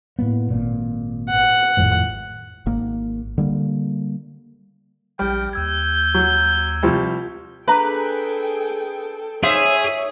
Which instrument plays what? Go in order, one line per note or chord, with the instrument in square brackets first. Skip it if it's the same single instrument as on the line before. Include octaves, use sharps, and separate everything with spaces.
[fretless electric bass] A2 A#3 B3
G#1 A#2
[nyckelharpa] F#5
[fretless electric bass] G#1 F2 A2
[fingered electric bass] G#1 A#3
D3 G3 A#3
[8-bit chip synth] A#1 F6 [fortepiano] G3 [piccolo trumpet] G5
[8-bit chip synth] D#2 E6 G#6 [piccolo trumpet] G6
[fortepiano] F#3
C2 F3
[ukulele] D4 A#5 B5 [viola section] G#4 A4 G5 [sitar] B4
[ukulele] D#4 C5 [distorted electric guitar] G#4 [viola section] C#5 [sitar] E5